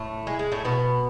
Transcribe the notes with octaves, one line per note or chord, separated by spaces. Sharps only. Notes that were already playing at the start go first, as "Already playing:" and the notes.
Already playing: A2 A3
G#3
G#3
A2 A3
B2 B3